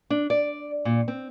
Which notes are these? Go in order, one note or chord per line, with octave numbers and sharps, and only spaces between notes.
D4
D5
A#2
C4